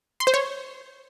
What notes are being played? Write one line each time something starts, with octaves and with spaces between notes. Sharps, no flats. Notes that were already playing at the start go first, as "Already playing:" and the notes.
C6
C5
C#5